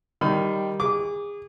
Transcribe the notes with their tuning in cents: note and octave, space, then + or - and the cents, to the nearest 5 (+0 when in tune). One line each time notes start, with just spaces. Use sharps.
D#3 +0 G3 -5 B5 +40
G#4 -30 D6 -20